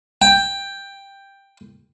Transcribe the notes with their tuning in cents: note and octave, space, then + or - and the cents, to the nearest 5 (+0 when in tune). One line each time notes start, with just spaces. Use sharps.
G5 +10